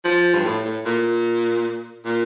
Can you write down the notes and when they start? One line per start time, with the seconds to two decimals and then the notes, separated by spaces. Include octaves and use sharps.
0.04 F3
0.35 G2
0.45 A2
0.65 A2
0.85 A#2
2.05 A#2